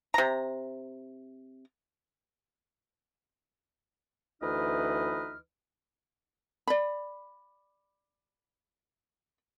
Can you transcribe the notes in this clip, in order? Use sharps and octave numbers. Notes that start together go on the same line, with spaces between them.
C3 A#5
D2 E3 D#4 B4 D#5 F6
D5 B5